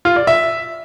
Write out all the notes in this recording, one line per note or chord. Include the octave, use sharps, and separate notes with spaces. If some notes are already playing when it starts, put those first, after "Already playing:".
F4
D5
E5